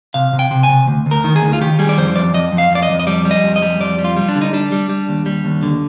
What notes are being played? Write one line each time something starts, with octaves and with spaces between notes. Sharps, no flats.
C3 F5
C3
G5
C3
G#5
C3
D2
D2
A#4
D#3
G#4
D2
F4
D#3 G4
G3 G#4
D5
F2 C5
F2 D5
F2 D#5
F2
F5
F2 D5
D#5
F2
D#5
G3 D5
G3
D#5
F2
D#5
G3
F2 D5
G3
F4
G3
D4
D3
D#4
G3 D4
G3
G3
D#2
G3
D#2
D3